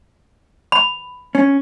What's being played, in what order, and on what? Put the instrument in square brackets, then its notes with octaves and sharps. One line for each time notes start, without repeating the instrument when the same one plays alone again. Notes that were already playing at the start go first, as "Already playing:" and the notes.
[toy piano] B5
[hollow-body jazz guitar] C#4